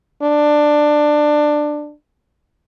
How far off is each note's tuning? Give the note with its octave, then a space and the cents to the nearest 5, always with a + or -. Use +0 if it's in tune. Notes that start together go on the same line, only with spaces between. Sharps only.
D4 +15